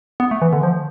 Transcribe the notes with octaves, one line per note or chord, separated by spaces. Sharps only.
B3
A3
E3
D3
F3